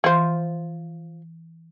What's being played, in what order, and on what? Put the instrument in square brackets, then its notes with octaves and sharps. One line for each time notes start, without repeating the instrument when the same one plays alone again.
[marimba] E3 [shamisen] F3 C5